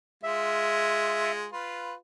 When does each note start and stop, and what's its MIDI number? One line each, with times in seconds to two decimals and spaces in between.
0.23 1.47 56
0.23 1.47 65
0.23 1.32 76
1.52 1.94 65
1.52 1.94 71